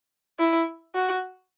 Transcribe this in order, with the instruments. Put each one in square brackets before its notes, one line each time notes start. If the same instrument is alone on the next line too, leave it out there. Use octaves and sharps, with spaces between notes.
[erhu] E4
F#4